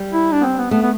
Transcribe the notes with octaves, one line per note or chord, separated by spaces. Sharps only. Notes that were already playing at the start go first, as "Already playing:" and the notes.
Already playing: G3
E4
D4
B3
C4
B3
A3 B3
B3